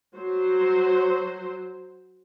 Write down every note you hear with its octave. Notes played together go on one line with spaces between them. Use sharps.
F#3 C5